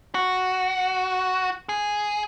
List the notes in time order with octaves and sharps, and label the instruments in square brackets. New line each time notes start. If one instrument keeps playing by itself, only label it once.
[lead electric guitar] F#4
G#4